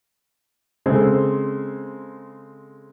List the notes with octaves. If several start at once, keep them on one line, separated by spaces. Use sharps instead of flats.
C#3 G#3 C4 A4 C5